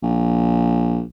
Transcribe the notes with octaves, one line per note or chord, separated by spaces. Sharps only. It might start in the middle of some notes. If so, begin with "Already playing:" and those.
A#1